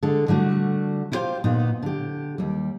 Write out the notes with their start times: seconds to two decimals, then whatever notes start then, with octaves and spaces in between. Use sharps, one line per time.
0.03 D3 G#3 A4
0.28 D3 G3 A3 F#4
1.12 E4 F4 G4 A#4 C5 F5
1.44 A#2 B3 D#4
1.82 D3 G4
2.38 D#2 G3